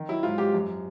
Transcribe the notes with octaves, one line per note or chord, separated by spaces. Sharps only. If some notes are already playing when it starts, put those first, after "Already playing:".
Already playing: D#3
F#3 E4
G#2 F4
G#2 G4
F#2